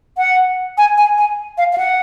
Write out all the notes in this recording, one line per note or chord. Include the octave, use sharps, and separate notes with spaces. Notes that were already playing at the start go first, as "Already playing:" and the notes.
F#5
G#5
G#5
G#5
F5
F5
F#5